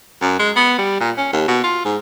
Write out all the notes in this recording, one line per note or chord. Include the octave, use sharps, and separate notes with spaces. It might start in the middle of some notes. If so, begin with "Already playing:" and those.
F#2
G#3
B3
G3
A#2
C#4
D#2
B2
F4
G#2